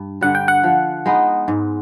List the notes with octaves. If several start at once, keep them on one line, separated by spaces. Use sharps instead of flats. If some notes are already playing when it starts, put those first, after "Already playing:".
Already playing: G2
D3 G3 F#5
G5
F#5
F3
G#3 B3 D#4
G#2